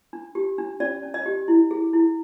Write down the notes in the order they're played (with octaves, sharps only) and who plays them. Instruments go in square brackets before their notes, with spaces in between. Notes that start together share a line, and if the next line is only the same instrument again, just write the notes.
[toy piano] D4
G4
D4
C#4 D5
C#4
D#5
G4
E4
G#4
E4